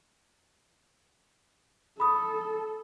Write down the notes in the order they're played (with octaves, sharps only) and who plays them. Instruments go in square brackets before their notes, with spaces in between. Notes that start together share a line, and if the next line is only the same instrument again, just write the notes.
[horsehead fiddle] A4 [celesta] B5 D#6